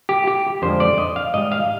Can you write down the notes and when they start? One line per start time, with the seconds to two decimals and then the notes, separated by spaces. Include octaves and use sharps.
0.09 G4
0.27 G4
0.62 F2 D3 F3 G#3 C5
0.80 D5
0.98 D#5
1.16 F5
1.33 G#2 G3 D#5
1.52 F5